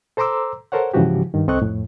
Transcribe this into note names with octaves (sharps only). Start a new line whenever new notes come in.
A4 C5 A#5 C6 D6 E6
A4 A#4 C5 C#5 F#5
G#2 C#3 E3 F3 F#4 G4
G2 D#3
C2 C4 A4 D#5 C#6 F#6
F2 A2